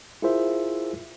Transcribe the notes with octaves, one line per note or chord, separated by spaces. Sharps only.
E4 F4 G#4 A#4 C5 E5